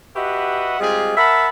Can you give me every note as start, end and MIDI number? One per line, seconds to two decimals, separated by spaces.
0.16 0.76 66
0.16 0.76 67
0.16 0.76 71
0.16 0.76 75
0.16 0.76 76
0.16 0.76 78
0.80 1.16 55
0.80 1.16 56
0.80 1.16 60
0.80 1.16 65
0.80 1.16 67
0.80 1.16 68
1.17 1.49 70
1.17 1.49 76
1.17 1.49 78
1.17 1.49 81
1.17 1.49 83